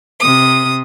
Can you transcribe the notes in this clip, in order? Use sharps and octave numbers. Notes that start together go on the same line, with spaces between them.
C3 D#6